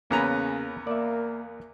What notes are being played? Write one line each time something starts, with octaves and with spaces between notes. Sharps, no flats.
E2 C#3 A#3 B3 C#4 A#5
A#3 D5 E5